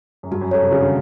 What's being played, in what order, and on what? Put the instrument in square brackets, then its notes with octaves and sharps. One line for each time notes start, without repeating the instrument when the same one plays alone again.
[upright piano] F#2
[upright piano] G2 [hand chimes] F#4
[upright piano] F#2
[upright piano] F#2 [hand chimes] A4 C#5
[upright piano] C3
[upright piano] C#3 [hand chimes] F#4
[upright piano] D3